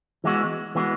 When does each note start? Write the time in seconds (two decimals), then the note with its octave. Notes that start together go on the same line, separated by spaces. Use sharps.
0.24 E3 G#3 B3 F#4
0.75 E3 G#3 B3 F#4